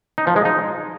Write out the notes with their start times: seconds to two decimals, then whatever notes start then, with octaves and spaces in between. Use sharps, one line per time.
0.18 D#4
0.27 F3
0.36 G#3
0.45 D#4